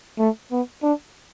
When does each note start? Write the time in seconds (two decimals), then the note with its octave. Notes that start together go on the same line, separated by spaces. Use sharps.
0.19 A3
0.52 B3
0.83 D4